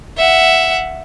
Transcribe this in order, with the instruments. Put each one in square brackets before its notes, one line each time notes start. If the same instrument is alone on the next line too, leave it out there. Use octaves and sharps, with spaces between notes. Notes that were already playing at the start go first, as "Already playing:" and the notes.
[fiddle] E5 F#5